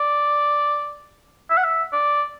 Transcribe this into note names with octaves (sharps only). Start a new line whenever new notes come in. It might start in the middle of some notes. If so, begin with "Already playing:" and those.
Already playing: D5
E5
F#5
E5
D5